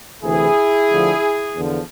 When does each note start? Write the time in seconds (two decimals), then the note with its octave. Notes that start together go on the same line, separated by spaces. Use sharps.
0.23 D2 C3 E3 E4 G#4
0.90 D2 D3 F3
1.56 E2 D3 F3